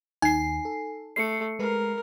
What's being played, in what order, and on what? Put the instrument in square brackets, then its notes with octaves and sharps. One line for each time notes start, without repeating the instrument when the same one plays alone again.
[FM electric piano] D#2 [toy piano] D#4 [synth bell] G#5 C7
[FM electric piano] A4
[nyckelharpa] A3 [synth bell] C7 C#7
[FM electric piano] G#3 B4 [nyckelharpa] A#4